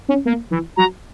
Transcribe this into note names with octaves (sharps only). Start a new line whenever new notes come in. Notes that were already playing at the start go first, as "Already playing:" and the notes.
C#4
A#3
E3
F#3 A#5